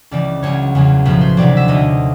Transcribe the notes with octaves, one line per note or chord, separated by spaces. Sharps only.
C#2 C#3 E3 D5
C#2 C#3 F#3 C#5
E2 C#3 F#3
B1 A2 F3 B4
C5
D2 C3 D#3 F#3 D5
E5
D#2 D3 F#3 D#5